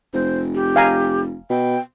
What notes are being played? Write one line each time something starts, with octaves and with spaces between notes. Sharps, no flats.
F1 C5
G4
F5 G#5 A#5
B2 G5